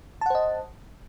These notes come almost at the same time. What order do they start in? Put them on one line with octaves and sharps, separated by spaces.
A5 F#5 C5 D#5